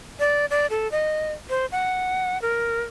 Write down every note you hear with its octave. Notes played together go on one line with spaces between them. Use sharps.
D5
D5
A4
D#5
C5
F#5
A#4